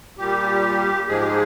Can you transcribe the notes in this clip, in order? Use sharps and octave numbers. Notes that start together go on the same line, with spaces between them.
A#2 G3 G4
G#2 F3 G#3 G#4
G4
G#4